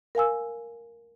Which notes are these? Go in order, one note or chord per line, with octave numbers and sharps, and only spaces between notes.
A#4 F5 G#5 E6